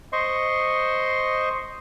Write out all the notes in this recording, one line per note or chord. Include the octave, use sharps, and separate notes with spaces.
C5 D#5 C6 C#6